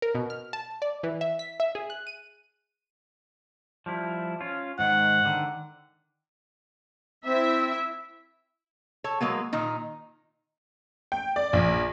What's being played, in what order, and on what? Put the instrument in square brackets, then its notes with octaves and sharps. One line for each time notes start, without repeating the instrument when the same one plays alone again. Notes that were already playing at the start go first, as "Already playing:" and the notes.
[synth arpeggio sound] A#4
B2
F6
A5
D5
E3
E5
B6
E5
G#4
F#6
D#7
[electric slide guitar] F3 G3 E4
C#4 F4
[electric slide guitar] G#2 D#3 [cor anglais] F#5
[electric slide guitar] D3 D#3
[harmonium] C4 [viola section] E4 E5
[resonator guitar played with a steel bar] A4 C#5
F#3 G#3 A#3 B3
A#2 D#3 D#4
[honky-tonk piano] G5
D5
A#1